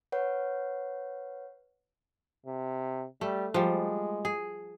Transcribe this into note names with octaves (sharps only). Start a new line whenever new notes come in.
B4 C#5 F#5
C3
G3 A3
F3 G3 G#3
G#4